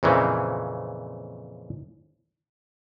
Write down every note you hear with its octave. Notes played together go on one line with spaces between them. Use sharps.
F2 A#2 C#3 E3 C4 C#4